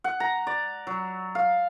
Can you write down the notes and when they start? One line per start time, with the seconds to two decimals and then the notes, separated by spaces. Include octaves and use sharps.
0.04 F#5
0.20 A#5
0.47 D5
0.87 F#3
1.35 F5